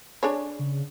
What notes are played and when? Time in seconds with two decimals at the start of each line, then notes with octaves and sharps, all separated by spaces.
0.23 D4 G#4 C#5
0.59 C#3